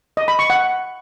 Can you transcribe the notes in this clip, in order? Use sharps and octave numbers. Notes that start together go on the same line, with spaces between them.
D#5
B5
C#6
F#5